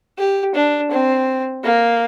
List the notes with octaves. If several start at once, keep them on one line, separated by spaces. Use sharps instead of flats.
G4
D4
C4
A#3